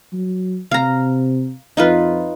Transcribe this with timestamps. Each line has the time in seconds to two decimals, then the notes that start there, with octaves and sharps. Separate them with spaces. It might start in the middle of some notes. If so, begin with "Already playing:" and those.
0.13 F#3
0.71 C3 F5 A#5
1.77 F2 D#4 F4 B4